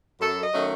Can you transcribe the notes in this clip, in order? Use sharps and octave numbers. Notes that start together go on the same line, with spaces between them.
F#2 A4
D#5
D#3 F#3 A3 C#4